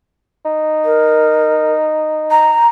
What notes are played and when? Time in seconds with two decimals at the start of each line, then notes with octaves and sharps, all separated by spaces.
0.45 D#4
0.85 A#4
2.31 A#5